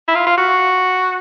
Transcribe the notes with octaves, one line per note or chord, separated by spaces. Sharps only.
E4
F4
F4
F#4